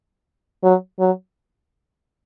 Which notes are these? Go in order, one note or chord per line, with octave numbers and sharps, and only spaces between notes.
F#3
F#3